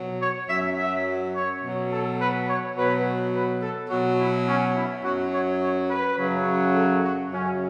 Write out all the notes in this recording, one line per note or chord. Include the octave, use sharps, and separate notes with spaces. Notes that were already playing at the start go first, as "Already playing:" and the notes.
Already playing: B2 F#3
C#5
F#2 F#3 E5
E5
C#5
B2 F#3
A4
B4
C#5
B2 F#3 B4
B4
A4
B2 F#3 F#4
E4
C#4
E4
F#2 F#3 F#4
C#5
C#5
B4
F#2 C#3 F#3
A4
F#4
F#2 C#3 F#3 C#4